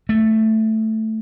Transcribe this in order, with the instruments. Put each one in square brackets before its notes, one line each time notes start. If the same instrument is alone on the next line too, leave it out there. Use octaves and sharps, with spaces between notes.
[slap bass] A3